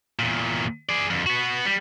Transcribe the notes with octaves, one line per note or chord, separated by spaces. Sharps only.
E2 A#2
G#4 D5
F2 D3
B3 F#4
G3